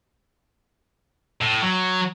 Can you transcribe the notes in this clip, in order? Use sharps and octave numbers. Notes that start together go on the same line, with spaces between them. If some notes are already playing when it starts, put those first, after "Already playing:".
A2
F#3